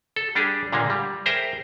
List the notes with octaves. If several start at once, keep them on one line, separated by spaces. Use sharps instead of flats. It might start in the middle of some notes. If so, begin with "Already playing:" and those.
A4
G3 D4 G4 G#4
A#2 D3 G#3 A#3
G3
G#4 A#4 C5 E5 G5 A#5